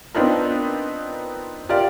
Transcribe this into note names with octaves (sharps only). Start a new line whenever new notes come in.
B3 C4 D4 D#4 F4 A#4
F4 G4 A#4 D5 F5